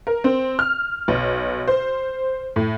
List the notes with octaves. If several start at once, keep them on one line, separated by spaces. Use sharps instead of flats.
A#4
C4
F6
B1
C5
A2